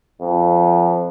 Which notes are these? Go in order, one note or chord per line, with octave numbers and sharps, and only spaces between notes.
F2